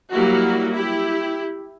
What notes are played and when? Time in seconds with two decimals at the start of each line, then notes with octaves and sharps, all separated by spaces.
0.12 F#3 G3 A#3 E4 F#4
0.73 E4 G4